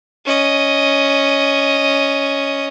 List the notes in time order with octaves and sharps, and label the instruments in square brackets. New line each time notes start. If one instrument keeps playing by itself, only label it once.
[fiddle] C#4 D#5